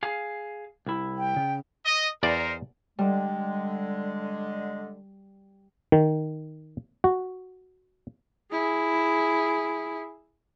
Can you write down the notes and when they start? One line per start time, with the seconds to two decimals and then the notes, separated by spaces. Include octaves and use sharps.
0.03 G#4 F5
0.86 C2 E4
1.18 G5
1.36 C#3
1.85 D#5
2.23 E2 D#4 A#4 C5 D5
2.99 D3 G3 G#3
5.92 D#3
7.04 F#4
8.52 E4 G#4